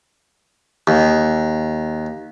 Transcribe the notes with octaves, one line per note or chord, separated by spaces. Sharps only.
D#2